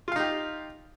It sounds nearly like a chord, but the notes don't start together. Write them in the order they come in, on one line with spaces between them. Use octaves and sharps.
F4 F5 D#4 G4